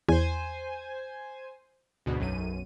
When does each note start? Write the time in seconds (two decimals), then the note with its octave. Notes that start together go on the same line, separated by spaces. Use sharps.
0.09 E2 C5 G#5
2.06 D2 G#2 B2
2.19 B1 F#2 D#7